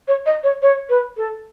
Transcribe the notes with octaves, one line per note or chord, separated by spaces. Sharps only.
C#5
D#5
C#5
C#5
B4
A4